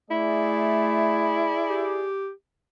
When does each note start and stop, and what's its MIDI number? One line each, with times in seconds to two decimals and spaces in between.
0.11 1.56 57
0.11 2.02 64
0.11 2.09 68
0.11 2.09 74
1.70 2.31 67